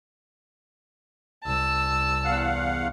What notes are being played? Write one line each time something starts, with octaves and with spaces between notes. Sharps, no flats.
C2 A5 E6
E2 F5 F#5